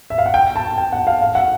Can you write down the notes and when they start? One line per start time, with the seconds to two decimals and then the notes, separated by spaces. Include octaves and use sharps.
0.10 E5
0.18 F5
0.26 F#5
0.34 G5
0.56 A5
0.78 G5
0.92 F#5
1.07 F5
1.21 F5
1.35 F#5